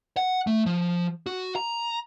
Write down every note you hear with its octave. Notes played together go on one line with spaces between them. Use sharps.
F#5
A3
F3
F#4
A#5